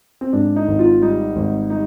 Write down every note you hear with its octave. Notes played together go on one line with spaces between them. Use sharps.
C4
G#2 D4
D#4
G#1
F4
G3 D#4
G#1
G3 D#4